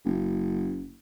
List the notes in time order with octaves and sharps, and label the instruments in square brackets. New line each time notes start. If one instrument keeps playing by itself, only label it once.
[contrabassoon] F#1